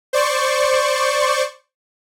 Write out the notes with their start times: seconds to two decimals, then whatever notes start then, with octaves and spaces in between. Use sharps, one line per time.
0.13 C5 D5 C#6